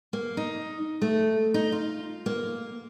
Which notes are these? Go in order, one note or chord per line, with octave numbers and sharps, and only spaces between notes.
A#3
D#4
A3
D#4
F4
A#3